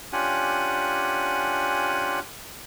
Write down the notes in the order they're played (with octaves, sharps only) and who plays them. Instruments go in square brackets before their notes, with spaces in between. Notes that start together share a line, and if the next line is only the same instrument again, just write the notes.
[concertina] C#4 D4 F4 G4 F#5 G#5